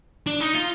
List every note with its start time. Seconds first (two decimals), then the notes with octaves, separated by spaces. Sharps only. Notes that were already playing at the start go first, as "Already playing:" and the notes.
0.27 D4
0.40 D#4
0.54 F4